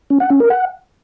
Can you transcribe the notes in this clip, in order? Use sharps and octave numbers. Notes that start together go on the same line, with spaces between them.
C#4
F#5
C#4
A#4
F#5